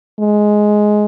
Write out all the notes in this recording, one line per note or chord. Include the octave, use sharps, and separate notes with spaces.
G#3